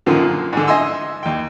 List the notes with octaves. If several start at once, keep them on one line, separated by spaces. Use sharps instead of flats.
F#2 A#2 D3 D#3 F3
G#2 D3
D#5 E5 G#5 C6 E6
D#2 G5